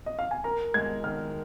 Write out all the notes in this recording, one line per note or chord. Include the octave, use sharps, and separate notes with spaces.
D#5
F5
G#5
A#4 A#5
G#3 G#6
D#3 F6